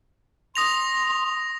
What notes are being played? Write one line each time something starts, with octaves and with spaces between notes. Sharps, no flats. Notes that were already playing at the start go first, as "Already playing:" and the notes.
C6 D#6 A#6 F7